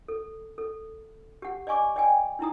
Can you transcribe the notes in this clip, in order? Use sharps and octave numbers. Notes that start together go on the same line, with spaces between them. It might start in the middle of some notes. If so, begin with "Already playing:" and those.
A4
A4
G4 F#5
D5 D#5 G#5 C#6 D6
D5 D#5 G5 G#5
D#4 E4 A#5 D#6